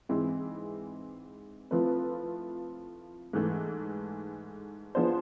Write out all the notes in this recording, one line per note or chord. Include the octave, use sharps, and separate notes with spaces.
G#2 E3 G#3 C4 E4
F3 A3 C4 E4 B4
G#2 E3 A3
F3 B3 D4 G#4 C5